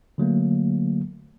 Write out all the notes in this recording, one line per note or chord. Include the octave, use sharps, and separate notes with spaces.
D3 F#3 A3 A#3